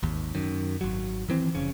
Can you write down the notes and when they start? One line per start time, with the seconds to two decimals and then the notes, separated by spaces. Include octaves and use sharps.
0.03 G#1 D#2
0.35 F#2 D#3
0.81 G#1 F#3
1.28 D#3 E3 C4
1.55 F1 C#3 C#4